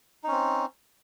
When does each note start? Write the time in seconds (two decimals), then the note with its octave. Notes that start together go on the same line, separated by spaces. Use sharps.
0.24 D#4
0.28 C#4
0.32 C4